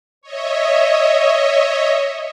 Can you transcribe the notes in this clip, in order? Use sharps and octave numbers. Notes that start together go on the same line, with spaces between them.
C#5 D#5 E5